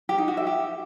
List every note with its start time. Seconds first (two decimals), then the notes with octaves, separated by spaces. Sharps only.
0.09 G4
0.18 D#4
0.28 F#4
0.37 E5
0.47 G4